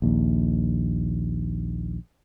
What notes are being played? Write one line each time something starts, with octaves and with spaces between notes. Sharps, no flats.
A#1 D#2